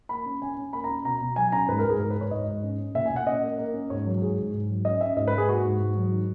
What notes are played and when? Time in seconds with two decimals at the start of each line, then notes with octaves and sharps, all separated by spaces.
0.09 A#3 B5
0.26 C#4
0.42 C#4 G#5
0.57 C#4
0.73 A#3 B5
0.84 A#5
0.89 C#4
1.05 B2 A#5
1.21 B2
1.36 F#3 G#5
1.52 C#4 A#5
1.68 G#2 B4
1.79 A#4
1.84 G#2
1.90 G#4
2.00 G#2 G#4
2.11 G#2 B4
2.21 C#5
2.31 G#2 D#5
2.47 G#2
2.64 C#4
2.79 C#4
2.95 A#2 E5
3.06 G#5
3.11 A#2
3.16 F#5
3.27 C#4 D#5
3.42 A#3
3.58 A#3
3.74 C#4
3.90 G#2 C#5
4.06 F#3
4.21 G#2 G#4
4.38 G#2
4.54 G#2
4.69 F#3
4.85 C#4 D#5
5.01 C#4 E5
5.16 G#2 D#5
5.28 B4
5.33 G#2 G#4
5.49 A#3 F#4
5.65 G#2
5.80 G#2
5.97 F#3
6.12 D#3